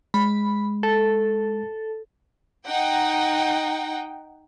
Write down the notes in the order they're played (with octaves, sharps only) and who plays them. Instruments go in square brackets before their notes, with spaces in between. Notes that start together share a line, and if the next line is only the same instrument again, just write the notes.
[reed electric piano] G#3 [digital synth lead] B5
[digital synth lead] A4
[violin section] D#4 F#5 G5